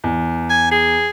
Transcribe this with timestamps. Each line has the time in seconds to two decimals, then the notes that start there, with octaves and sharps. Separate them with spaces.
0.04 E2
0.50 G#5
0.71 G#4